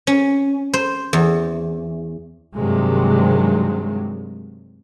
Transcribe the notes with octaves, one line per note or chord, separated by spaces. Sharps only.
C#4
C5
E2
G2 C3 D#3 F#3 G#3